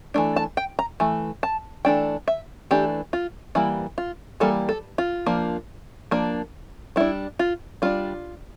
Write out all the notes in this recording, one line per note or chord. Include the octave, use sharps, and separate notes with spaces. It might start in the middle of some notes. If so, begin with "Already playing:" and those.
E3 A3 D4
A5
G5
A#5
E3 A3
A5
E3 A3 D4 G5
E5
E3 A3 D4 G4
F4
E3 G3 A#3 E4
F4
E3 G3 A#3 A4
A4
F4
F3 A#3 D4
F3 A#3 D4
G3 D4 E4
F4
G3 D4 F4